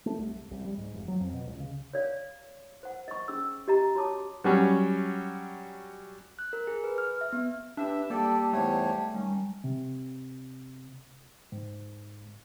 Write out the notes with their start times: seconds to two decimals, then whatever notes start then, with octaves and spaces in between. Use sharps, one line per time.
0.06 A3
0.19 C2
0.35 C2
0.51 C2
0.65 G3
0.78 G#2
0.94 F1
1.08 F#3
1.20 F2
1.34 B2
1.47 C#2
1.60 C#3
1.93 C#5 D5 F5
2.83 C5 F#5
3.08 D#5 C#6
3.28 C#4 G#4 E6
3.68 G4 D#5 A#5
3.95 F#4 C#5 A5 D6 D#6
4.44 F#3 G3 C#4
6.39 F#6
6.53 A#4
6.67 G#4
6.84 B4
6.98 F6
7.21 E5
7.33 B3
7.77 D4 G4 B4 E5
8.10 G3 A#3 G4 A4 D5 A5
8.53 E2 G#2 A3 C#5
9.14 D#3 G3 C#4
9.64 C3
11.52 G#2